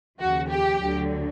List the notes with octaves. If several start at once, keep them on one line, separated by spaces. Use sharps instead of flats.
D#2 C#3 F3 F#4
G4
D2 D3 F#3